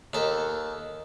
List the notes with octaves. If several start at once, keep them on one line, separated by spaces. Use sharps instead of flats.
D#2 A4